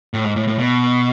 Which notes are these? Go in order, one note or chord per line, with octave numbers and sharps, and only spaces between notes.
A2
G#2
A2
A2
B2